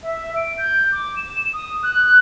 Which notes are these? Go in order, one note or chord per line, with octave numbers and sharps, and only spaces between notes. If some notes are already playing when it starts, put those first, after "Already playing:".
E5
D7
G6
D6
E7
D#6
F#6